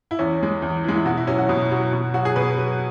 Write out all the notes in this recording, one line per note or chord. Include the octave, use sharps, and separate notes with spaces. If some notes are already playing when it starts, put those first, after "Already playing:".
E4
E2 C#4
E3 G#3
E2
E3 G#3
E4
B2 F#4
E4
F#3 C#4
F#4
B2
F#3
B2
F#3 F#4
G#4
B2 B4
F#3